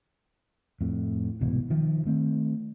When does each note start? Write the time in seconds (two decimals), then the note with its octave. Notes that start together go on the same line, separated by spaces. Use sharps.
0.81 F2 A2
1.41 C2 G#2 B2 E3
1.70 D#3 F3
2.05 D#3 A3 C4